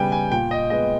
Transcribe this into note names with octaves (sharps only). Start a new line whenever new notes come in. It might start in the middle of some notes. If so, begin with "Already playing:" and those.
Already playing: C#3 G3 B3 G5 G#5
G#5
A#2 G5
D#5
G#3 B3 D#5